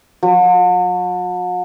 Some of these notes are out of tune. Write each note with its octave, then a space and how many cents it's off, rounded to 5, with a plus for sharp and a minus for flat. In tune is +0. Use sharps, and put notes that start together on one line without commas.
F#3 -45